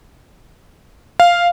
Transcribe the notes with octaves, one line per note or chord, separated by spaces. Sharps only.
F5